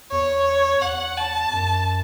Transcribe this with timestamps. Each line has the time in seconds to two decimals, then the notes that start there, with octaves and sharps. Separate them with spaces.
0.11 E2 C#5
0.82 E2 F#5
1.18 A5
1.53 F#2